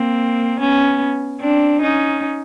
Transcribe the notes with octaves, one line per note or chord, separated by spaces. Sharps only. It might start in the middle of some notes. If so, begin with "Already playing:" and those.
Already playing: A#3 C4
B3 C#4
C4 D4
C#4 D#4